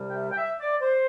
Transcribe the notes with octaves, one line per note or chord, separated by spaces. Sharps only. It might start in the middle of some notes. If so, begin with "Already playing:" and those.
Already playing: C2 C3 G3
G5
E5
G5
E5
D5
C5